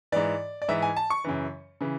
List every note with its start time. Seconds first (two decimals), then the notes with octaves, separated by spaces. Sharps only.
0.12 G#2 E3 D5
0.62 D5
0.68 G#2 E3 E5
0.82 G#5
0.96 A5
1.10 C#6
1.24 F#2 C#3 E3
1.81 C#3 E3